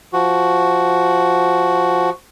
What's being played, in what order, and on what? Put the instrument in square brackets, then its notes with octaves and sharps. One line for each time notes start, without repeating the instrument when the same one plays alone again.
[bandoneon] F3 F#4